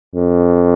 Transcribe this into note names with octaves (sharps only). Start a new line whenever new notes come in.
F2